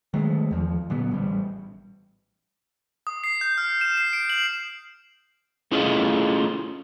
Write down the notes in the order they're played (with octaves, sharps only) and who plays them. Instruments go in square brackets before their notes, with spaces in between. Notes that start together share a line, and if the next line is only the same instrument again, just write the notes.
[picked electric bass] D#3 F#3 G#3 A3
E2 F3
A#2 D3 F#3 B3
A1 G3
[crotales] D#6
C7
G6
F6
E7
C7
D7
F#7
[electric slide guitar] A3 C#4 E4 F4 G#4 D#5